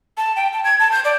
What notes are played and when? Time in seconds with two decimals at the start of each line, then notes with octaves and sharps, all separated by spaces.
0.17 A5
0.36 G5
0.53 A5
0.64 G#6
0.80 A5
0.92 G6
1.05 D5